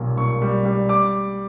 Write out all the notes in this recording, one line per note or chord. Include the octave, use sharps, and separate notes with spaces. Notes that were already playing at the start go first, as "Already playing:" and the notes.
Already playing: B1 A#2 G3
A#2 C#6
G3
G3
D6